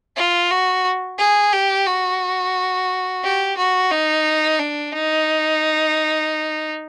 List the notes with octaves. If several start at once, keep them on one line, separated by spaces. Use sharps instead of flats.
F4
F#4
G#4
G4
F#4
G4
F#4
D#4
D4
D#4